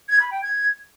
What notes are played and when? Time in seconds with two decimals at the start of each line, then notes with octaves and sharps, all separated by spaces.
0.09 G#6
0.20 B5
0.31 G5
0.42 G#6